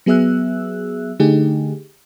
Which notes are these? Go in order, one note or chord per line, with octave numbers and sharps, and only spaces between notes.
F#3 B3 G#4 E5 E6 F#6
D3 A3 D#4 G4 G#4